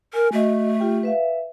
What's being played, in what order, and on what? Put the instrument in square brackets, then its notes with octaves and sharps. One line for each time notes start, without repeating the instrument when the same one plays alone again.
[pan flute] A#4 [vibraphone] G#5
[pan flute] A3 [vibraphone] F#4 D#5
[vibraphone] F4 G4 G5
B4 E5 F5